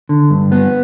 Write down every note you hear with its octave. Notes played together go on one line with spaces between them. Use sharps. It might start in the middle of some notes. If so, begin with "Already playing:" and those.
D3
G2
B3